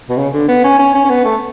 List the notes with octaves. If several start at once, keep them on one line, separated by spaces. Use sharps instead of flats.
B2
C#3
D3
B3
C#4
C#4
C#4
C#4
B3
A3